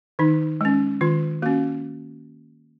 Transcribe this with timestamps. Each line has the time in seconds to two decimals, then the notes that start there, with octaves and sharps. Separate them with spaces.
0.19 D#3 D#4
0.61 G#3 C#4
1.01 D#3 F4
1.42 A#3 C#4 F#4